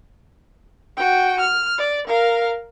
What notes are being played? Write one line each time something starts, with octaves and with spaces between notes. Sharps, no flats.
F#4 G5
F6
D5
A#4 F5